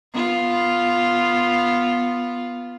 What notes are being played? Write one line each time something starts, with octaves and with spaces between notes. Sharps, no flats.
B3 F4